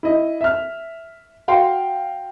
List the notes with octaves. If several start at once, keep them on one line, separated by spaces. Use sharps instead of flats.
E4 D#5
E5 F6
F#4 F5 G5 C6